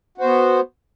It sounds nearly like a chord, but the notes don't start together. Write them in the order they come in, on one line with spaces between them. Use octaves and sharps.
F#4 C5 B3